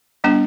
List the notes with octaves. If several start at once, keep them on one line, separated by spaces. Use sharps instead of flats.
G3 B3 D4